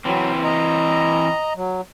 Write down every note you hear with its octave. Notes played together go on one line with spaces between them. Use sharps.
E3 F#3 C4
D#5 A#5
F#3